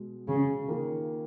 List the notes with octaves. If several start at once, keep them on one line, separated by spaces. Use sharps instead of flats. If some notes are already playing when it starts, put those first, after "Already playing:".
Already playing: B2 G#3
C#3
D#3 A#3 F4